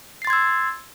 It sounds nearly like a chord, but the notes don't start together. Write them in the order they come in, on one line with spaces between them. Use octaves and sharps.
C7 A6 C6 G#6 E6